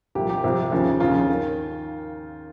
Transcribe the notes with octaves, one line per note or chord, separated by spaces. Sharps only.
C2 A#2 F3 G4
G4
C2 C3 F3
D#2 C#3 F3
D#2 C#3 F3 F4
D#3